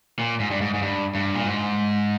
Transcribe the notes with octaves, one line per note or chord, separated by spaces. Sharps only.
A#2
G#2
G2
G#2
G#2
G2
G2
A#2
G#2